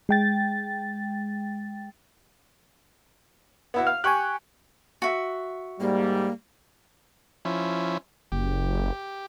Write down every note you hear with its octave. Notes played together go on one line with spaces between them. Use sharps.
G#3 G5 A6
B3 E4 F#4
F5 F6
G4 G#5 C#6 F#6
F#4 E5
G#2 G3 A#3
F3 C#4 E4
F#1 G4